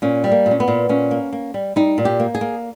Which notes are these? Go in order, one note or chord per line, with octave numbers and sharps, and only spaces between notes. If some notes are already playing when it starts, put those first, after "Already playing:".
A#2 C#4
G3
A#3
A#2
C#4
B3
A#2
A#2 C#4
A#3
A#3
G3
G3 D#4
A#2
G4
A#3
G#4
A#3